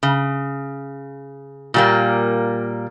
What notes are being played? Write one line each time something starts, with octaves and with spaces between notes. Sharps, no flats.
C#3
A#2 G3 A#3